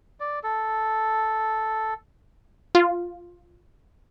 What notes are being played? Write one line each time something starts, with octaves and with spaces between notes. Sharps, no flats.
D5
A4
F4